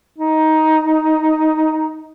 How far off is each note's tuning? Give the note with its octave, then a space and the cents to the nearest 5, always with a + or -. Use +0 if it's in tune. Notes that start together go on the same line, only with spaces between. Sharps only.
D#4 +10